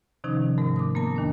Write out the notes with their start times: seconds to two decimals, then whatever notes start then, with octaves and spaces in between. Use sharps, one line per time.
0.24 C3 D#3 F3 C#4 D#4
0.58 G#2 A3 A#4
0.76 D6 D#6
0.95 A#3 B3 A#4 A5
1.16 E2 D#3 D4